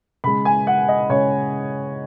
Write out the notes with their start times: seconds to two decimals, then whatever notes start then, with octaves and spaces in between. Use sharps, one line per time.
0.24 C#3 G#3 B5
0.45 G#5
0.67 F#5
0.88 D#5
1.09 C#3 G#3 C#5